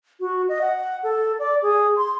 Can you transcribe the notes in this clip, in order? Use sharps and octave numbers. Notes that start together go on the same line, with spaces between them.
F#4
D#5
F#5
A4
D5
G#4
C6